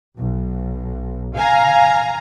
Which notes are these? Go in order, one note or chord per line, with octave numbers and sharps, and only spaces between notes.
B1
F5 G#5 A#5